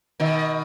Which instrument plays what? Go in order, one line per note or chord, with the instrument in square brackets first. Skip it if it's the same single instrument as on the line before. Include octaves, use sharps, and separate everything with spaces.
[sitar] B2 D#3